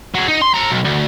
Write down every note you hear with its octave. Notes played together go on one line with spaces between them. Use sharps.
F#3 G#4
D#4
C6
A4 A#5
B1
D2